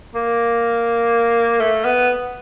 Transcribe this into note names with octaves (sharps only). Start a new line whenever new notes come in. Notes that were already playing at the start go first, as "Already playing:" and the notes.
A#3
A3
B3